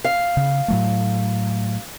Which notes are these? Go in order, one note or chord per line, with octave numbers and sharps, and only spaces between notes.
F5
C#3
A2 F#3 A3